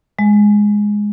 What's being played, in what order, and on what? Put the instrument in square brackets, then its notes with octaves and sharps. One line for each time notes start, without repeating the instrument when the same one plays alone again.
[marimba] G#3